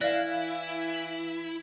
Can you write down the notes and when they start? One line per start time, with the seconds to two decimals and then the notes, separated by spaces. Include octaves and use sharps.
0.01 E3 E4 D5 F5 F#6 A#6